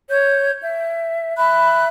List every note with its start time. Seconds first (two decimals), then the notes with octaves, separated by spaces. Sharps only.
0.10 C#5 G6
0.60 E5
1.37 E5 B5 F#6